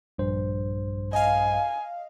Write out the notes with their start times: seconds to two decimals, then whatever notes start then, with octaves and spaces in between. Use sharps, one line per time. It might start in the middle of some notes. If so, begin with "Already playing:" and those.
0.18 A#1 G2 C5
1.13 D#5 F5 G#5